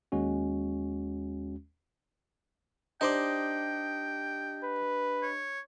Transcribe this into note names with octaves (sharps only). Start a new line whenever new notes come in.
D#2 G#3 C#4 F#4
D4 D#4 G4 C5 D5 D#5 G5
B4
C#5